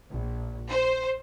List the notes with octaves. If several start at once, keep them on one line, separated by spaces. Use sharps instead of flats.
A#1
C5